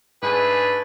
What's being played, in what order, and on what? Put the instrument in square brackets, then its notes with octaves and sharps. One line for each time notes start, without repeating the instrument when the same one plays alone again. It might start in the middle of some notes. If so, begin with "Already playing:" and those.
[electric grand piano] G#2 G#5 G6 [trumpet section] A3 D4 G#4 [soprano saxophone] B4